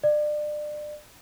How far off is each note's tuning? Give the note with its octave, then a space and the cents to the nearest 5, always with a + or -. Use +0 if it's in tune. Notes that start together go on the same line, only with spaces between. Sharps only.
D5 +30